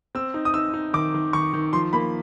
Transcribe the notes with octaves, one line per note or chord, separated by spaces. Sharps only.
C4 E6
D#4
D#6
D#4 E6
D#4
D#3 D6
D#3
D#3 C#6
D#3
F3 C6
A#3 B5